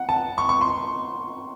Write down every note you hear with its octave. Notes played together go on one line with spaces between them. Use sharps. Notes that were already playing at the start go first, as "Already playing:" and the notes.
Already playing: F#5
A5
C#6
C#6
C6